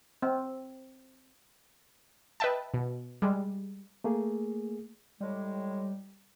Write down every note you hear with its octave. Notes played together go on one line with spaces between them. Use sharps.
C4
B4 D#5 E5 G5 A5
B2
G3 G#3
A3 A#3 G#4
A2 G3 G#3